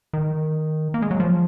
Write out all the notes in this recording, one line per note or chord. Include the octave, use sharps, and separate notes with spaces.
D#3
A#3
G#3
F#3
F3